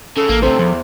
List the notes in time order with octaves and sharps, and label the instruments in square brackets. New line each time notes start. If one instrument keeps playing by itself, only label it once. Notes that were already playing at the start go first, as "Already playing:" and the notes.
[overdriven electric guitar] C#3 [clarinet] A4
[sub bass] A1 [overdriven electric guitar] A#3
[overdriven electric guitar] D2 C3 [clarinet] A4 [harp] C5
[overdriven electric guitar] E2 [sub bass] F3